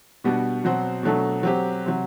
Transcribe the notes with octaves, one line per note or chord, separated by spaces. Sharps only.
B2 G3 B3 D4 F#4
B2 F#3 C4 F#4 C5
B2 F#3 A3 D4 A4
F#3 C4 G4
C3 F#3